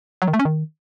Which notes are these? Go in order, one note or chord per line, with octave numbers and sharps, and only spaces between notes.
F#3
D#3
A3
C#4
D#3